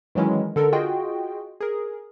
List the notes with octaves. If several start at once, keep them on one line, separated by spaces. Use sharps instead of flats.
D#3 E3 F#3 G#3 C#4 E4
D3 A4 A#4
F4 F#4 G#4 D#5 G5
G#4 A#4